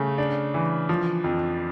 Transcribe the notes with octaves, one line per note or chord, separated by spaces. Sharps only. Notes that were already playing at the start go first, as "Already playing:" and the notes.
Already playing: C#3 A3
D4
E3
F3
F2